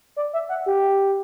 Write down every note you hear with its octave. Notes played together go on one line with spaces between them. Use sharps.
D5
E5
F#5
G4